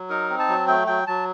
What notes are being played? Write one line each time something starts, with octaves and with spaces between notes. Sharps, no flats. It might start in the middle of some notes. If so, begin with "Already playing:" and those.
Already playing: F#3
D#4 A#4
C4
A5
F#3
A3 G5
F#3 G5
F#3 A5